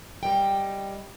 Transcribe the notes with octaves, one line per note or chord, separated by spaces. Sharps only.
G3 D#5 G5